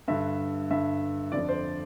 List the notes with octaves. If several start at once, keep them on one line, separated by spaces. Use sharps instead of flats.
G2 D3 E5
G2 D3 E5
F2 D3 D5
C5